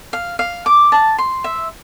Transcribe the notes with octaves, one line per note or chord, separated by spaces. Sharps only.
F5
F5
D6
A5
C6
E5